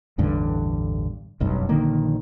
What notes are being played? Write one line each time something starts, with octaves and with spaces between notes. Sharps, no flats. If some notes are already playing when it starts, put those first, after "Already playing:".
A1 E2 G2 D3
F1 B1 G2
A#1 D3 D#3 A#3